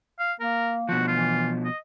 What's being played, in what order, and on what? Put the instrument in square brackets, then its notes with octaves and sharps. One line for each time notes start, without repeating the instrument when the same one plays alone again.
[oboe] F5
[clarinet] A#3 [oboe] A#4
[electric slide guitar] B2 F3 [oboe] F#4
[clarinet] E3 [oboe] F4
[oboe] D#5